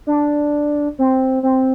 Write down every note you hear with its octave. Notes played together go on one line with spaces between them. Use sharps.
D4
C4
C4